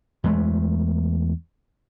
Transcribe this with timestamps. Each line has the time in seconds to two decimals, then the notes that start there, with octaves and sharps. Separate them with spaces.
0.24 E2 G#3 A3